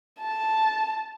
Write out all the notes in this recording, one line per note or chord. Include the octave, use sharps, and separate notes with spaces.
A5